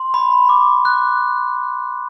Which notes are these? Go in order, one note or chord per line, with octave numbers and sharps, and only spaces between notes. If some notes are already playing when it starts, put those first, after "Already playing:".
Already playing: C6
B5
D6
F#6